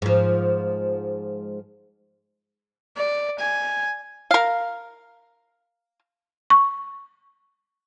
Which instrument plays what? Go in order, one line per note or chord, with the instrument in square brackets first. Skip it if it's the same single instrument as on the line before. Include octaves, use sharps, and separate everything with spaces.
[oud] G#2 F3
[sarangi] D5
G#5
[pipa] A#4 F5
[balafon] C#6